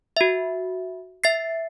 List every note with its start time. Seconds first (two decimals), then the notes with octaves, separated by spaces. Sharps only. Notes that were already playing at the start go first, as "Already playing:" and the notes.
0.17 F#4 E5
1.24 E5 A6 C7